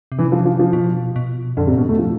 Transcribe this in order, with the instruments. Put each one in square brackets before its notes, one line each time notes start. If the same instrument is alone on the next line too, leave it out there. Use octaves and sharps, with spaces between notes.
[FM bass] C3
[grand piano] E3
F3
F3
F3
[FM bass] B2
B2
[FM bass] F2 [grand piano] D3
[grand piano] C3
[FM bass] F2 [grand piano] B2
[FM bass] E2 [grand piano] A3
[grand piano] F3